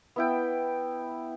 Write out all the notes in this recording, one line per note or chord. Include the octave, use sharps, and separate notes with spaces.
B3 E4 G5